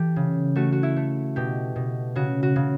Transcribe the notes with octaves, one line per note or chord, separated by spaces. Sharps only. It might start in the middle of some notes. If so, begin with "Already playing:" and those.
Already playing: E3 G4 A4
C#3
A3 F#4
F#4
E4
A3
B2 G4
B2
C#3 F#4
F#4
C#3